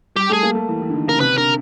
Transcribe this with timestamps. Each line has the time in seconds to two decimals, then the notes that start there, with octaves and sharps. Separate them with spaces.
0.16 G3 G4
0.30 A3 G#4
0.43 A#3
0.55 A3
0.68 E3
0.82 E3
0.89 D3
0.94 D#3
1.07 C#3 A#4
1.20 C3 B4
1.38 D3 A#4